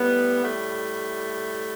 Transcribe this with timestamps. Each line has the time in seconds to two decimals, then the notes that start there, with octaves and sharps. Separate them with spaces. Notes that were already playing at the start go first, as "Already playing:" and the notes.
Already playing: A2 G3 B3
0.43 A3